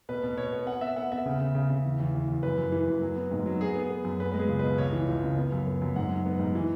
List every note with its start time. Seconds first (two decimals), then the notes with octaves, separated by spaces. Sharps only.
0.09 B2 B4
0.23 B2
0.37 B2 C#5
0.52 B3
0.67 B3 F#5
0.81 B3 E5
0.96 B3 F#5
1.12 B3 E5
1.26 C#3
1.41 C#3
1.55 C#3
1.70 C#3
1.85 E2
2.00 E2
2.15 E2
2.28 E2
2.43 F#2 B4
2.58 F#2
2.72 E3
2.88 F#2
3.02 F#3
3.16 B3
3.32 G#2
3.46 F#3
3.61 B3 G#4
3.75 B3
3.90 B3
4.05 F#2
4.20 B3 B4
4.31 G#3 B4
4.39 G#4
4.48 C#2
4.59 B2 B4
4.78 C#2 C#5
4.93 E3
5.08 C#2
5.23 C#3
5.37 B3
5.52 F#2
5.67 B3
5.82 F#2
5.96 G#2 F#5
6.10 F#3
6.25 B3
6.39 G#2
6.55 E3